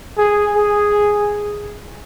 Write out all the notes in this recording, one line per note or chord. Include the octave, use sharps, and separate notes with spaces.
G#4
G#4